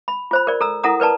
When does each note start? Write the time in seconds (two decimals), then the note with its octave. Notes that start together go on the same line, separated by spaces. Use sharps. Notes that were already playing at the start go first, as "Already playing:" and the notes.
0.08 B5
0.31 F4 C5 B5
0.47 A#4 D5
0.61 A4 A#5 E6
0.84 E4 A4 A#4 F#5 A#5 D#6
1.00 A#4 B4 D5 A5 A#5